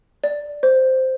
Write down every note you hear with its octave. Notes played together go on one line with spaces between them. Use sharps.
D5
C5